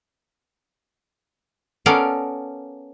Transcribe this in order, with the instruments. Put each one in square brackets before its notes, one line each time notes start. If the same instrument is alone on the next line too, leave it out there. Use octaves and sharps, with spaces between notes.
[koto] B3 C#4 A4 A#4 D5 F5